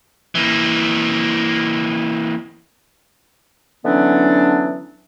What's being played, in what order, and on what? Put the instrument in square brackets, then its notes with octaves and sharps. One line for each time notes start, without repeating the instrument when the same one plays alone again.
[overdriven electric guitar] E3 A#3
[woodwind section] D3 E3 F#3 B3 C#4 D4